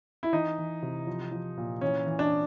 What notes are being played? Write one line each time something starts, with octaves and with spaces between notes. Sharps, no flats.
E4
E3 D#4
E3
C3
F3
F3
A#2
E3 C#4
E3
D4